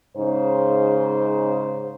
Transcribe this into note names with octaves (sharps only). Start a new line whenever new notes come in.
G#2 C#3 C5